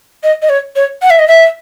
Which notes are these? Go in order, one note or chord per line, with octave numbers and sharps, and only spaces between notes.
D#5
D#5
C#5
C#5
F#5
E5
D#5
E5